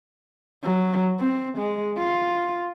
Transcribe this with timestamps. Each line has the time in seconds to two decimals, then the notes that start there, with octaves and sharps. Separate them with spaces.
0.64 F#3
1.20 C4
1.58 G#3
1.98 F4